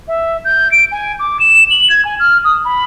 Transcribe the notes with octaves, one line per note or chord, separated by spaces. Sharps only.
E5
G6
D7
G#5
D6
E7
F#7
G#6
G#5
F6
D#6
B5